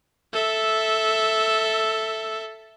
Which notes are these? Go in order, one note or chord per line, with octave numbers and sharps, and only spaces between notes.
A4 E5